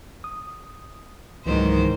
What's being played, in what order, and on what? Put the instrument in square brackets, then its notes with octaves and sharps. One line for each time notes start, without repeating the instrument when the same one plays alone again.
[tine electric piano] D#6
[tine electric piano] C#2 E3 F#3 [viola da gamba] G#2 D#3 C5